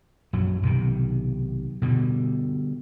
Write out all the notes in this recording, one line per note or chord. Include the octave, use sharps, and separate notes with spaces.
A#1 F#2 F#3
B1 C3 D#3
B2 D3 G3